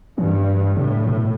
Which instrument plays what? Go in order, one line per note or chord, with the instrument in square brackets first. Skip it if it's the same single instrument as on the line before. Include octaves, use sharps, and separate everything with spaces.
[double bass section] G2 [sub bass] E3
[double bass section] A2 [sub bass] C3
[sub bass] B2